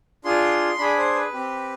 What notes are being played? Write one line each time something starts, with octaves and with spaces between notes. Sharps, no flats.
D4 F4 G#4 C6
D4 G#4 B5
C5
B4
C4 G4